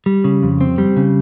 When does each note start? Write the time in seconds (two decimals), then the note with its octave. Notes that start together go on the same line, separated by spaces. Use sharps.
0.06 G3
0.24 C#3
0.43 F2
0.61 C4
0.78 G3
0.97 C#3